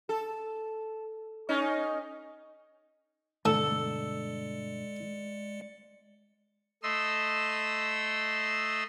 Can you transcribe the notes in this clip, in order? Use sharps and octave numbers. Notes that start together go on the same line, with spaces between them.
A4
C#4 D#4
G2 B2 D3 G#3 A3 A4 D5 C#7
A3 D#5 C6 E6